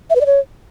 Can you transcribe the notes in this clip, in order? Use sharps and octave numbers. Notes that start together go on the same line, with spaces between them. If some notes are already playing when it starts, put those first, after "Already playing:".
E5
B4
D5
C#5